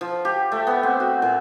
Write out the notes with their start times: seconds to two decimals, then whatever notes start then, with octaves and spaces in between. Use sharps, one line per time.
0.01 F3
0.25 G4
0.52 A3
0.67 B3
0.83 C4
1.00 F#4
1.22 A#2